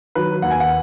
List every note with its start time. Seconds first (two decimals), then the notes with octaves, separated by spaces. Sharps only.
0.15 D#3 F#3 B4
0.42 D#2 F#5
0.51 G#5
0.60 F#5